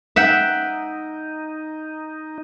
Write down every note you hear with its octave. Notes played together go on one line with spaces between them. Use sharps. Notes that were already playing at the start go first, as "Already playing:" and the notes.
D#4 E5 F#5 G5